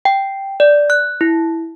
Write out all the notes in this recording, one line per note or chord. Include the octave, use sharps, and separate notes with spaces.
G5
D5
F#6
E4